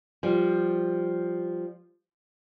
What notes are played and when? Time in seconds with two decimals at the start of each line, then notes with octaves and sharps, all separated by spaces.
0.23 F3 G3